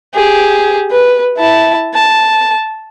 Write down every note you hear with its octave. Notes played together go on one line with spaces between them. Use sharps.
G4 G#4
B4
E4 A5
A5